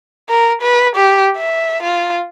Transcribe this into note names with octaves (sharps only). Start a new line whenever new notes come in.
A#4
B4
G4
E5
F4